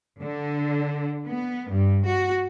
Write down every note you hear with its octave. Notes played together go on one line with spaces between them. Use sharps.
D3
B3
G2
F#4